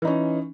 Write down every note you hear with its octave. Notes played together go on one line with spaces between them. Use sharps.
E3 C#4 D#4